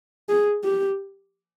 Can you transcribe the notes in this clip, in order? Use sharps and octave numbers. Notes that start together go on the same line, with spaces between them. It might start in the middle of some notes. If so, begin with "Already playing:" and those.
G#4
G4